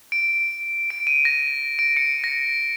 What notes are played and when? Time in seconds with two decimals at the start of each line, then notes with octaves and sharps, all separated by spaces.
0.12 D7
0.90 D7
1.07 D#7
1.25 A#6
1.79 D7
1.97 C#7
2.24 A#6